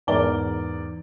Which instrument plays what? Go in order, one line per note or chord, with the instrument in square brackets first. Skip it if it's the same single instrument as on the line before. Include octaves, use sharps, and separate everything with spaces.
[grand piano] E2 G#2 A#4 D5 G7